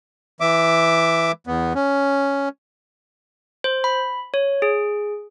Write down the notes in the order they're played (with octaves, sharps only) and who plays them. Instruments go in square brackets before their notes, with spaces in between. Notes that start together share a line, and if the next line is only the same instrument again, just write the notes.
[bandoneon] E3 E5 D6
E2 B3
C#4
[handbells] C5
B5
C#5
G#4